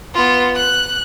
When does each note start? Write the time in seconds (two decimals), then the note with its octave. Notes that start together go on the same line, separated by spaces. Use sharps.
0.15 B3 F4
0.56 F#6